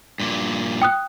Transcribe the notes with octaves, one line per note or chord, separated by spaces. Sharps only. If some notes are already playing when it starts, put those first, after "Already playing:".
G2 A#2
G5 D#6 F#6